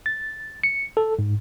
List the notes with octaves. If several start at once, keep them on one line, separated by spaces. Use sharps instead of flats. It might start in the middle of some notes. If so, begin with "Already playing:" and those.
A6
C#7
A4
G#2